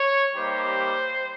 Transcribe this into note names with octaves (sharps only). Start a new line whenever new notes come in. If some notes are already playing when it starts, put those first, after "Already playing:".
Already playing: C#5
G3 A#3 D#4 G4 C5